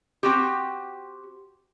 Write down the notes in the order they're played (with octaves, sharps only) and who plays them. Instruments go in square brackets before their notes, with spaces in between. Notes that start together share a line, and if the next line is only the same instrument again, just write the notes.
[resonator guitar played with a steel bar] C4 F#4 G4